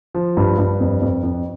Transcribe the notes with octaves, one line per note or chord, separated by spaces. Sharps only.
F3
G2
G2
F2
F2
F2